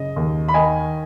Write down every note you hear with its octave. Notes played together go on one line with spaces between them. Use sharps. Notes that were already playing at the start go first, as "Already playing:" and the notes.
Already playing: F#1 C#3 D#5
D#2
B5
D#3 D#5 G#5